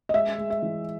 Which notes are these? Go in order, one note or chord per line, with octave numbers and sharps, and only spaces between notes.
D#5
G#3 E5
G#3
E5
E3